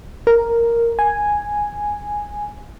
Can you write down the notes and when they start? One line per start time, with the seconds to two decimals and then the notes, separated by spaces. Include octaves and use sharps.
0.27 A#4
0.99 G#5